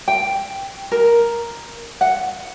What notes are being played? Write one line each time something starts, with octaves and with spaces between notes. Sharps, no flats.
G5
A#4
F#5